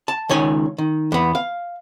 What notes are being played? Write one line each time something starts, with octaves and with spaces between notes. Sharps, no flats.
A5
C#2 D#3 C#5 G#5
D#3
E2 B3
F5